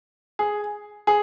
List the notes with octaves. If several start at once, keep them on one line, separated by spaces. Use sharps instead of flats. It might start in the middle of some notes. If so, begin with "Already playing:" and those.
G#4
G#4